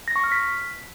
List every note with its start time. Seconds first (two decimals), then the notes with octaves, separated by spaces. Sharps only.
0.08 A#6
0.16 C#6
0.24 F6
0.32 B6